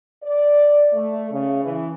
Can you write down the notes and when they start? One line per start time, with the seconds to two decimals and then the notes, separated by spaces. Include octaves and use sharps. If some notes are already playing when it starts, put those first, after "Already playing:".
0.23 D5
0.93 A3
1.30 C#3
1.64 E3